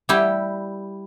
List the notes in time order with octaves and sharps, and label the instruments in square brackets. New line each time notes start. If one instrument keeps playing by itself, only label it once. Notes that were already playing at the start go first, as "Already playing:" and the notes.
[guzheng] G3 E4 G4